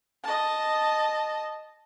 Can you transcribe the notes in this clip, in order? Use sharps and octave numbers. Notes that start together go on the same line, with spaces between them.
D#5 A5